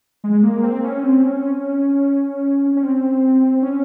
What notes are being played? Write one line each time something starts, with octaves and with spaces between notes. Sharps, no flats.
G#3
A#3
C4
C#4
C4
C#4
C#4
C4
C#4